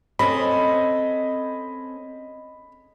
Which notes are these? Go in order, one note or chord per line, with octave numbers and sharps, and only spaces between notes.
C4 C#4 A4 D#5 B5